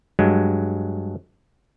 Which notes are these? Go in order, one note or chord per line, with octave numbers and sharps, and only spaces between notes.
G2 F#3 G#3